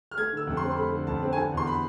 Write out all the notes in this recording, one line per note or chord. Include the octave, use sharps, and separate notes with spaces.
F6
A3 G#6
D3 E6
F2
C6
C4
C6
A3 B5
D3
F2 A5
C4
G#5
D3 A5
E2
C6
B5